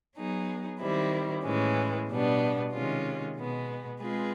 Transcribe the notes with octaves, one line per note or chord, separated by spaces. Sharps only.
F#3 B3 D#4 G#4
D#3 G3 C4 E4
A2 E3 G#3 C#4
B2 G3 B3 D4
C3 D#3 G#3 C#4 F4
B2 G#3 B3
G#3 C4 F4 G#4 B4